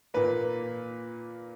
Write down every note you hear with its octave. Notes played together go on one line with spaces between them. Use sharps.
A#2 A#3 B4